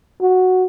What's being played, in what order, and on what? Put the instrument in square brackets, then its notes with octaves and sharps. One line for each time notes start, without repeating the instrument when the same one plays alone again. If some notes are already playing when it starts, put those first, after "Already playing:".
[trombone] F#4